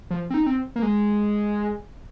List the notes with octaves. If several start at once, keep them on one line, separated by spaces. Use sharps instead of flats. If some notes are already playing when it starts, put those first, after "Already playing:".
F3
C4
D#4
C4
A#3
G#3